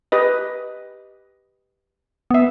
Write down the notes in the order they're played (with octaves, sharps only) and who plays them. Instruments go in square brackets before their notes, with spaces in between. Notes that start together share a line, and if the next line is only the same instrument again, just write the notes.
[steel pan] G4 B4 D#5
[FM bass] B3 [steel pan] E5 D#6